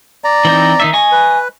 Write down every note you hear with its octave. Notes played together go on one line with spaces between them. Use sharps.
D5 A#5
E3 C4 D#4
D#3 D#4 E5
D#5 G#5 C#6
B4